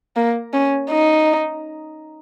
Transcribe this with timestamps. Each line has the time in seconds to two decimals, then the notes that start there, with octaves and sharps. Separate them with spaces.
0.16 A#3
0.53 C#4
0.91 D#4